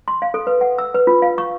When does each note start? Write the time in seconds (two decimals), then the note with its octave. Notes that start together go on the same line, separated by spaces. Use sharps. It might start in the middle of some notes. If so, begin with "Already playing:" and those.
0.08 C6
0.22 F5
0.34 A4
0.47 B4
0.61 F#5
0.78 E6
0.94 B4
1.07 F4
1.22 F5
1.38 C#6